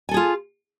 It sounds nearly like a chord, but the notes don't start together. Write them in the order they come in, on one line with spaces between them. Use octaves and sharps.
G#5 A4 G#4 F4